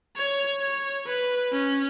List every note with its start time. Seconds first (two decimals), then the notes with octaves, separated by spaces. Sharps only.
0.16 C#5
0.60 C#5
1.06 B4
1.52 C#4